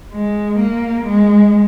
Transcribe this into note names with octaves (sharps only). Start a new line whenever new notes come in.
G#3
A#3
G#3